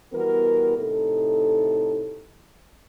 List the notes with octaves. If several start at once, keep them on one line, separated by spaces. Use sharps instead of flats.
E3 G3 B3 F#4 A#4
A2 C3 D#4 A4